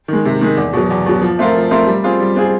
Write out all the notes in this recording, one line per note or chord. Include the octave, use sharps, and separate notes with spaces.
D#3 G#3
C3
D#3 G#3
E2
B2 F#3
E2
B2 F#3
F3
A3 C4 F4 A#4
F3
A3 C4 F4 A#4
G3
C4 F4 G#4
G3
C4 F4 G#4